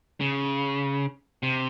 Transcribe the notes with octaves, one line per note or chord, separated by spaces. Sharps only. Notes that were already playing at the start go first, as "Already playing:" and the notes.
C#3
C3